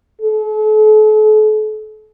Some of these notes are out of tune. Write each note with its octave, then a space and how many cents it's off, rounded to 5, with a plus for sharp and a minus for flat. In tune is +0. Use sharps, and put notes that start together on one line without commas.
A4 -40